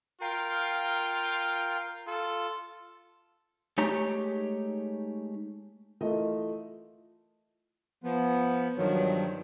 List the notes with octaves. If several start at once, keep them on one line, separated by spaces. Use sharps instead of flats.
F4 A#4 F5 G5
F4 A4
G#3 A3 D#4 G4 C#5 A#5
E3 A3 F4 A#4 D#5
F3 B3
G2 D#3 F3 F#3